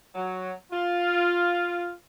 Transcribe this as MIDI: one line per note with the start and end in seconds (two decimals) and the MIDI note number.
0.14 0.51 54
0.71 1.91 65